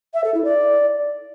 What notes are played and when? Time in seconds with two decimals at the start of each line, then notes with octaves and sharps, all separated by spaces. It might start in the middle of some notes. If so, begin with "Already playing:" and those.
0.14 E5
0.24 A4
0.34 E4
0.44 D5